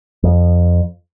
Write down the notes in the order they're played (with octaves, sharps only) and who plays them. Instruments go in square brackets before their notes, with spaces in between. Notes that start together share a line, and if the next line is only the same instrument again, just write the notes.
[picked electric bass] F2